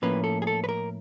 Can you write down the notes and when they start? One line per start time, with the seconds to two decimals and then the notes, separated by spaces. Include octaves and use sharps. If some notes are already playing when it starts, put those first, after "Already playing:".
0.02 A2 F3 A#3 C#4 E4 B4
0.24 A4
0.42 G#4
0.47 A4
0.64 B4
0.69 A#4